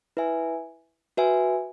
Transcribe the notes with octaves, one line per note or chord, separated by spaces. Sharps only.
E4 B4 E5 G#5
F#4 B4 E5 G#5